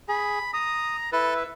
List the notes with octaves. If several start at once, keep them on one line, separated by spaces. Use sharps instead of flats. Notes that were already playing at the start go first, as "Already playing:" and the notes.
G#4 B5
A#5 D#6
E4 A4 B4
E5